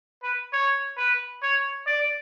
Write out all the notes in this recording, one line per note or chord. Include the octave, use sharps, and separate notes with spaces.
B4
C#5
B4
C#5
D5